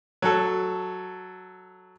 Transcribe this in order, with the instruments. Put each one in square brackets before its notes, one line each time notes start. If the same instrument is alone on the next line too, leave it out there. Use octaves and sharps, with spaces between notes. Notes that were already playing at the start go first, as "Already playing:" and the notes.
[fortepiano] F#3 A4